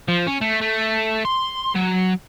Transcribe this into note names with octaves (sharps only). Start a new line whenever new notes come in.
F3
C#4
A3
A3
C6
F#3